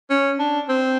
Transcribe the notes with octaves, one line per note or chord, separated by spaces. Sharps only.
C#4
D4
C4